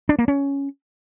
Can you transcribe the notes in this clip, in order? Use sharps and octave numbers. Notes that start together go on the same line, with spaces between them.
D4
A#3
C#4